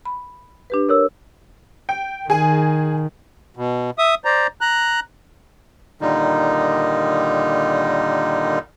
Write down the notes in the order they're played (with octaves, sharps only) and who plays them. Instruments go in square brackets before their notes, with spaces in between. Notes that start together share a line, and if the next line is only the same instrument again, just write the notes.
[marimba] B5
D4 G4 B4
[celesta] A#4 C#5 E6
[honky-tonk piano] G5
[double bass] D#3 [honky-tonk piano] G#4 G#5
[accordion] B2
E5 D#6
C5 D5 A#5
A#5 F#6
[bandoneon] A#2 D3 D#3 G3 D#4